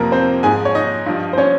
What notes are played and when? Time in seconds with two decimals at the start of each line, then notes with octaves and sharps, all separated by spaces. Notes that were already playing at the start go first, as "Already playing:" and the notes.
Already playing: F2 C3 F3 A#3 A#4
0.12 C4 C5
0.43 G#2 F3 G#4 G#5
0.65 C#5
0.75 D#4 D#5
1.06 G2 F3
1.33 C5
1.38 C#4 C#5